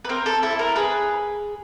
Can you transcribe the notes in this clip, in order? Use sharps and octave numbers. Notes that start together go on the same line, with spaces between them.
B4
C4 A#4
A4
E4 A4
A#4
G#4 B4